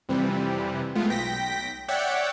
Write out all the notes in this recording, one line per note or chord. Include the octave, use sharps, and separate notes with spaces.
F2 C3 E3 G3
G#3 A3 B3 F4
B1 G5 A#6 B6
C#5 D5 E5 F#5 G5